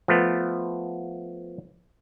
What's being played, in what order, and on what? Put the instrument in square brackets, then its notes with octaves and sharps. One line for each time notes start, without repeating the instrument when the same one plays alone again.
[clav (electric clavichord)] F3 A3 B3